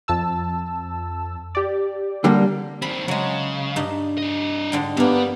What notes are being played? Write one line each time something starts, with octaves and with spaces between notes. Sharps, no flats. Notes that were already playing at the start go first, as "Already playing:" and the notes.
F2 A5 E6
G4 D5
D3 G3 A#3
D#3 C4 B5
C#3 F#3 G#3
G2 D#4
D4 D#5
G#2 D3 G5
G2 G3 A#3 B3 G4